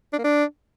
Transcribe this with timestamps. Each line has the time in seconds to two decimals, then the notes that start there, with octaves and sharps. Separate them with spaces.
0.13 D4
0.19 A#3
0.24 D4